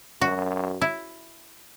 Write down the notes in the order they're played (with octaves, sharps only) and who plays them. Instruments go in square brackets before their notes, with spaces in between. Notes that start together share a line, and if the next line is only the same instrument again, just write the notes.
[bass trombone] F#2 [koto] F#4
[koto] E4